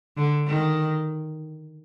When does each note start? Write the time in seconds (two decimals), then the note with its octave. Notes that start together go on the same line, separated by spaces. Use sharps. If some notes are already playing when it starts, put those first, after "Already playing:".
0.17 D3
0.48 D#3